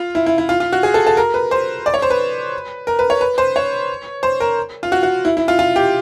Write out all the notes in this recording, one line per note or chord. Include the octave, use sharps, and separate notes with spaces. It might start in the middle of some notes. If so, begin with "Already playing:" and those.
Already playing: F4
E4
E4
E4
F4
F4
F#4
G#4
A4
A4
A#4
B4
C5
D5
C#5
C5
B4
A#4
B4
C#5
B4
C5
C#5
C5
A#4
F4
F#4
F#4
E4
E4
F4
F4
G4